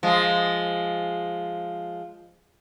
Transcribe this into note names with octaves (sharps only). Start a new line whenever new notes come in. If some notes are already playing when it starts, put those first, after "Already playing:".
F3 G#3